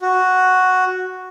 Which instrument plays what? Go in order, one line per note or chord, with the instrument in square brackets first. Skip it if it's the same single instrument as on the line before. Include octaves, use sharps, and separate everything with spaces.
[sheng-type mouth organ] F#4